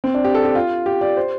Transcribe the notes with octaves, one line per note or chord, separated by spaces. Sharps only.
C4
D4
G4
A4
G4
F4
G4
D5
C5